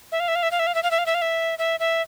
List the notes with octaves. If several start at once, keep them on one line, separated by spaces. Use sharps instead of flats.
E5
F5
E5
F5
E5
F5
E5
F5
E5
F5
E5
F5
E5
F5
E5
E5
E5